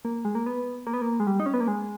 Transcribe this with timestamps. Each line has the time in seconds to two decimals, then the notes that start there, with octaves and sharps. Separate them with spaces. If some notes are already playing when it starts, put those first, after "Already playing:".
0.05 A#3
0.25 G#3
0.35 A#3
0.46 B3
0.87 A#3
0.93 B3
1.02 A#3
1.20 G#3
1.27 G3
1.40 D#4
1.46 C#4
1.54 B3
1.60 A#3
1.68 G#3